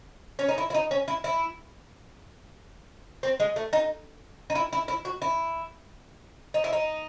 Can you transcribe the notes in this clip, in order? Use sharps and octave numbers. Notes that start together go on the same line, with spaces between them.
C#4
D#4
E4
E4
D#4
C#4
E4
E4
C4
G#3
A3
D#4
D#4
E4
E4
E4
F#4
E4
D#4
E4
D#4